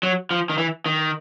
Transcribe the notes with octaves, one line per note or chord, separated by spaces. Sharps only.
F#3
F3
D#3
E3
D#3